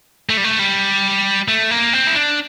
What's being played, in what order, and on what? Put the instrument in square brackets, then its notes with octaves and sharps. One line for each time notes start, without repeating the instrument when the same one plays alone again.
[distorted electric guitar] A3
G3
A3
G3
A3
A#3
C4
E4
D4